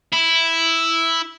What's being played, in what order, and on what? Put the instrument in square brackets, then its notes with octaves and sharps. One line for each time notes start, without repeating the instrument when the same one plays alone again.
[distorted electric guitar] E4